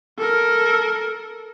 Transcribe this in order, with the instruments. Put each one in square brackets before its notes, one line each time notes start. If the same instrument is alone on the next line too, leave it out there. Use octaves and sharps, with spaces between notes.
[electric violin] A4 A#4